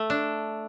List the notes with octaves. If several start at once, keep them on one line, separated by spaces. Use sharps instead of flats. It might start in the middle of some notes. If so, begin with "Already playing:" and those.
Already playing: A3
D4